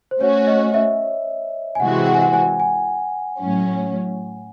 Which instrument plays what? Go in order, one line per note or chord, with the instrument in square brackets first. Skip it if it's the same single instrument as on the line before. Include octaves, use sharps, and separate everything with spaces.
[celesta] C5
[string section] A3 C#4 F#4 [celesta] C#5
[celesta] D#5
E5
G#5
[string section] C3 E3 G#3 C4 F#4 [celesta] F#5
[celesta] F#5
G#5
F#5
G#5
G#5
[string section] A2 F#3 C#4